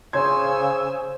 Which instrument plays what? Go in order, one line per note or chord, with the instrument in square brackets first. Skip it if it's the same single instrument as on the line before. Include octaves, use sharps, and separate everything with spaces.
[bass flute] C#3 [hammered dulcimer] C5 [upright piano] C#5 G#6 [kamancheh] G#5 E6